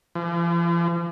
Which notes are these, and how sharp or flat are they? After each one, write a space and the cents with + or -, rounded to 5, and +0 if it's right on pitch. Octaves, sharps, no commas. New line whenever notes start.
F3 -45